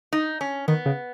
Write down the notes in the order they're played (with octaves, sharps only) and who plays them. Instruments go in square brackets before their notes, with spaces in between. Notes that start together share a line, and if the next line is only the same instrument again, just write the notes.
[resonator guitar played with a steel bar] D#4
C#4
[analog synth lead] D#3 [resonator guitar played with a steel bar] B3
[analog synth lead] C#3